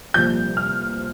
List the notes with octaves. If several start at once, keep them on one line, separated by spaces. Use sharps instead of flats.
C2 A#2 F3 G6
F6